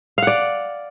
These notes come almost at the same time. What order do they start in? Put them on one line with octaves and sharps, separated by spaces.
F5 F#5 D5